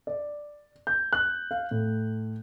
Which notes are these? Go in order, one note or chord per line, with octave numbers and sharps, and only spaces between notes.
D5
G6
F#6
F5
A2